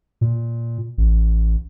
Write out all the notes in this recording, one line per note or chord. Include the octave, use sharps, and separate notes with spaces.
A#2
A1